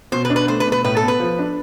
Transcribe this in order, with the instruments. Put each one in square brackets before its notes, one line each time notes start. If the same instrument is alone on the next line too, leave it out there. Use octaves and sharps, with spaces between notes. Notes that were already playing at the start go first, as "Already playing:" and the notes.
[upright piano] B2 [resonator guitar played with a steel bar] C5
[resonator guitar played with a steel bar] B4
[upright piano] D4
[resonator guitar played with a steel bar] B4
[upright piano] A3 [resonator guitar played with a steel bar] C5
[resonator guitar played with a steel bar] B4
[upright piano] B2
[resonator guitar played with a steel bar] B4
[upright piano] A2 [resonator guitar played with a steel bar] B4
[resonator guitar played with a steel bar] A4
[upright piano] B3
[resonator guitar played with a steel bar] B4
[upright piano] F3
D4